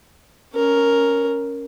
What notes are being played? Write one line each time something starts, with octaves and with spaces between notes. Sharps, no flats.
C#4 A#4